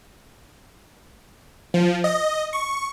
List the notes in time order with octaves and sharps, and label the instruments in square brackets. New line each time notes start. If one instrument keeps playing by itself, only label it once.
[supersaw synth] F3
D#5
C#6